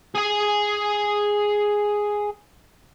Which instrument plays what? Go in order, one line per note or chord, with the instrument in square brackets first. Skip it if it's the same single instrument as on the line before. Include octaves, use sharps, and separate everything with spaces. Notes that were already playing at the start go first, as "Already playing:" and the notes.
[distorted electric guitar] G#4 G#5